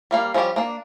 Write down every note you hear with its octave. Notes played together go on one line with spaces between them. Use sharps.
G3 A#3 F5
F3 G3 C#4 G4 G5
A#3 D4